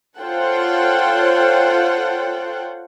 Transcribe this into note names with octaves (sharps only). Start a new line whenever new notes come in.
F4 A4 C5 C#5 F#5 G5